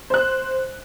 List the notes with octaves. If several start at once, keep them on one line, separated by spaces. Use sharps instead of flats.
C5 F#6